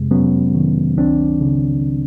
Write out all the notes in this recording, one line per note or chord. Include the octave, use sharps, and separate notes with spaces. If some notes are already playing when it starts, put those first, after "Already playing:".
Already playing: F2 C3 G#3
F#3 B3 C#4
D#3
C#2 C4 D4
C#3